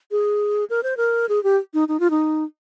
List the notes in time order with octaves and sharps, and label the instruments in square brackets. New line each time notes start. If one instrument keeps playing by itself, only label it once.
[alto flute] G#4
A#4
C5
A#4
G#4
G4
D#4
D#4
F4
D#4